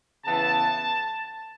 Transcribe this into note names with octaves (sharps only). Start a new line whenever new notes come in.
C#3 E3 B3 A5